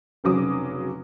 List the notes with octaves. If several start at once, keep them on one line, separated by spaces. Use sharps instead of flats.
F1 C#3 F#3 D6 D#6